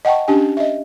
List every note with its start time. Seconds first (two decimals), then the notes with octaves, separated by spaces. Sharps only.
0.05 D#5 F#5 G5 A5 C#6
0.28 C#4 D4 G4 G#5
0.57 D#5 E5